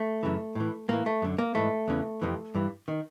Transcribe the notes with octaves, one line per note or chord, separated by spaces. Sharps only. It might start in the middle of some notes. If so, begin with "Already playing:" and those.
Already playing: A3
F#2 C#3 E3
A2 E3
A2 E3 A#3
A3
F#2 D3
A#3
G#2 E3 A3
E2 C#3 E3
F2 C3 E3
G2 E3
D#3